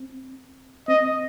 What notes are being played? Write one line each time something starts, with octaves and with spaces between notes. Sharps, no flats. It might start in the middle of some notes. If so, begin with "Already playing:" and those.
Already playing: C4
C4 D#5